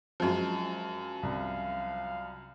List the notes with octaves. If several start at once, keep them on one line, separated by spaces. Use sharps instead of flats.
F#2 F3 F#3 G#3
C2 F5